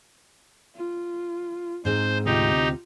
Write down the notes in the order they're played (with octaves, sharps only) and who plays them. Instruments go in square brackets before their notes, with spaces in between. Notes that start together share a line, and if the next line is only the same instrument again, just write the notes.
[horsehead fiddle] F4
[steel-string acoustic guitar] G#2 C4 G#4 [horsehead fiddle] D#4 [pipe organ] C5
[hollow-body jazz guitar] D2 C3 [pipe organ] D#4 G4 [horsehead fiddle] F4